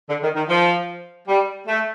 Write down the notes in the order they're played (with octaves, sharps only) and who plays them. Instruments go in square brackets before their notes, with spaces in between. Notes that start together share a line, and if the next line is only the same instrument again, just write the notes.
[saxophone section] D3
D#3
D#3
F3
G3
A3